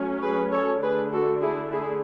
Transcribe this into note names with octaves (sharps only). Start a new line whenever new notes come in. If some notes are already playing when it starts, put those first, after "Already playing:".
Already playing: F#3 A3 C#4
G#4 B4
A4 C#5
D3 A3 D4 G#4 B4
F#4 A4
E4 G#4
E4 G#4